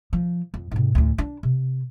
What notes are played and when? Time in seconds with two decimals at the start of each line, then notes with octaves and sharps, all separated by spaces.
0.13 F3
0.54 F2
0.71 G#2 C3
0.95 A1 D2
1.18 D4
1.43 C3